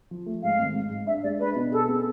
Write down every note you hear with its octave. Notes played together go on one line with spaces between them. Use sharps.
F3
A3
G#2 F5
G#1
G#2
G#2
D4 E5
G#3 D5
D4 B4
B2
G#4 A4
B3